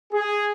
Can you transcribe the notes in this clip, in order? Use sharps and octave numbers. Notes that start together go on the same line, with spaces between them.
G#4